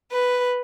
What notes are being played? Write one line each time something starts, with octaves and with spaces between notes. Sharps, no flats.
B4